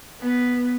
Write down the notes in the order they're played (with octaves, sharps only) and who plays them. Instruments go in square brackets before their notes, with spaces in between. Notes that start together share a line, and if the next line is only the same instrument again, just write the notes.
[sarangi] B3